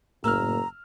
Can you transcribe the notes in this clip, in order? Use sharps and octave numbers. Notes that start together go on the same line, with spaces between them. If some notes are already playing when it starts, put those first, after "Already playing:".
F#1 A2 A#3 A#5 E6 F6